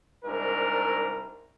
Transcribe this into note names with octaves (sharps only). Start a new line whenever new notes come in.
C2 G#2 D4 A#4